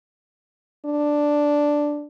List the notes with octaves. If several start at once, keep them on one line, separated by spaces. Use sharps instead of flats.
D4